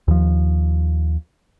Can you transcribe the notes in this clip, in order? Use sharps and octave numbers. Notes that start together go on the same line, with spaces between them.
D#2 F3